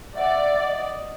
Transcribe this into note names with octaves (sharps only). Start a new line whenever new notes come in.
D5 E5 F#5
D#5